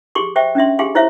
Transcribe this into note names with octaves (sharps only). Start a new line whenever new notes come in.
G4 G#4 C6 C#6
C5 E5 G5 C#6
C#4 D4 E5 C6
G4 G#4 F5 G#5 C6
E4 C5 C#5 E5 F5